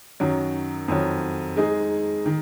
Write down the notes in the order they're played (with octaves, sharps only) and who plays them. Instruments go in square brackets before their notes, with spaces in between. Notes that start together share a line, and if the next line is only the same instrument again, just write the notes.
[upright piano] F#2 D#3 F#3
F2 D#3 F#3
G#3 D#4 G#4
D#3